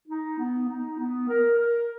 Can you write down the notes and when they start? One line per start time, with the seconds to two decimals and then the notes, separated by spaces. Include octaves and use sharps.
0.08 D#4
0.38 B3
0.68 D#4
0.98 B3
1.28 A#4
1.58 A#4